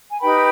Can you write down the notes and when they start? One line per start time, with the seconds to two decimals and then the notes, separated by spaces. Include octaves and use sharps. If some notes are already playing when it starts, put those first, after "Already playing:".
0.09 G#5
0.20 D#4 G4 B4 G5 B5